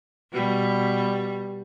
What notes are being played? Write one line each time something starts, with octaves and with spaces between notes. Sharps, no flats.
B2 G3